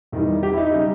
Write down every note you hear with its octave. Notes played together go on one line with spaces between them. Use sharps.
E2 D#3 G3
G4
E4
D#4
C#3 G3